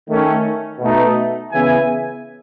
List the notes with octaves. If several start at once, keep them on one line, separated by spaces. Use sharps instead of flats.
D#3 A3 C#4
B2 A3 D#4
C#3 E3 B3 E5 G#5